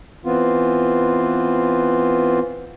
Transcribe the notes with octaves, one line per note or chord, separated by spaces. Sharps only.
E3 B3 C4 F4